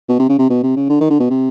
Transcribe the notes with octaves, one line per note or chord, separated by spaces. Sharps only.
B2
C3
C#3
C3
B2
C3
C#3
D3
D#3
D3
B2
C3